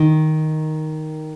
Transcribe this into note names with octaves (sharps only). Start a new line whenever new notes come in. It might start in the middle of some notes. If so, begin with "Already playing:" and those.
Already playing: D#3